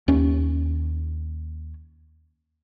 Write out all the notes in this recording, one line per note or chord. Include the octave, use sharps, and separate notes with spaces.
D#2 C#4